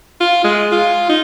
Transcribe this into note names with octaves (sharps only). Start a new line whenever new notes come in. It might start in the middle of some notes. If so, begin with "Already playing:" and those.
F4
G#3
F4
D#4